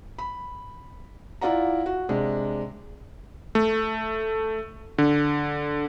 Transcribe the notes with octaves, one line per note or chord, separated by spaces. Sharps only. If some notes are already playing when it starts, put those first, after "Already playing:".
B5
E4 F4 D5 F#5 A#5
F#4
C3 G#3 D4
A3
D3